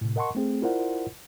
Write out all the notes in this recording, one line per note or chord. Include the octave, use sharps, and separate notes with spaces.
A2 C3
A#4 D#5 F#5 A5 C6 C#6
A3 C4 G#4
E4 F4 A#4 C5 D5 F#5